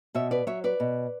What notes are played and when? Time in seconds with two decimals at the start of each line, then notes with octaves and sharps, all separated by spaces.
0.15 B2 C#5 E5
0.31 B4 D5
0.47 F#3 C#5 E5
0.64 B4 D5
0.80 B2